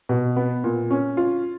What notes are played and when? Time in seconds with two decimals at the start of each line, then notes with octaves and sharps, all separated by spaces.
0.09 B2
0.36 B3
0.64 A#2
0.91 C#4
1.17 F4